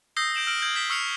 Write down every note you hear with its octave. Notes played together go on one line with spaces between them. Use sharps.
D#6 E6 G6 A#6 C7 G7
G6 D7 E7 F#7
E6 F6 D7 F#7
F6 G6 G#6 F#7
G6 B6 E7 G7
C#6 E6 F6 C7 C#7 F7